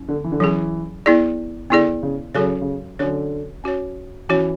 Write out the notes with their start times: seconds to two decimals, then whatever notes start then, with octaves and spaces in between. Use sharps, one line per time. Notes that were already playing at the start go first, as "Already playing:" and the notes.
Already playing: F#3 C#4 E4
0.09 D3
0.24 E3
0.32 D3
0.40 E3 F#3 C#4 E4 G#4
1.06 B3 E4 G#4 D5
1.70 D3 B3 E4 G#4 D5
2.03 C#3
2.34 C#3 F#3 C#4 F#4 A4 C#5
2.61 C#3
2.99 D3 F#3 C#4 F#4 A4 C#5
3.64 C#4 F#4 C#5
4.29 E3 C#4 F#4 C#5